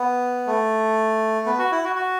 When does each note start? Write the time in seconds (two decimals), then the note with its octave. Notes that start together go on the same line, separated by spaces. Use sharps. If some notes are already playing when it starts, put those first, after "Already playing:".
Already playing: B3
0.47 A3
1.46 B3
1.58 F#4
1.72 E4
1.84 F#4
1.96 F#4